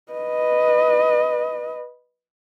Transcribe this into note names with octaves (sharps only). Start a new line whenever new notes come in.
B4 D#5